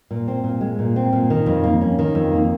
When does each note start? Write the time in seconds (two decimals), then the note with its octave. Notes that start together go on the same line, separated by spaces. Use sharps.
0.11 A#2
0.28 C4
0.44 A#2
0.61 G#3
0.79 A#2
0.96 C4
1.13 A#2
1.30 D#3
1.46 F2
1.64 A#3
1.81 C#4
1.99 D#3
2.15 F2
2.32 A#3